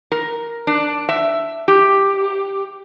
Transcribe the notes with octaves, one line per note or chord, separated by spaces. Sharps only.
A#4
D4
E5
G4